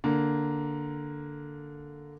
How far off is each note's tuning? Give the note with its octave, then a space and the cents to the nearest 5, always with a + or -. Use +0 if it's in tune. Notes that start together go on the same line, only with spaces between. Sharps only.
D3 +0 A#3 +0